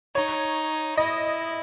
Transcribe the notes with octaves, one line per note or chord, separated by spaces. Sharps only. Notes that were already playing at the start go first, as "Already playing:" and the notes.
D#4 C#5
E4 D#5